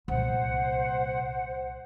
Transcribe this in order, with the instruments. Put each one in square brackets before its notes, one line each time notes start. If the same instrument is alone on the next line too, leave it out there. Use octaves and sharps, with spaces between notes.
[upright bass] C2 A#2 [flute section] C5 F#5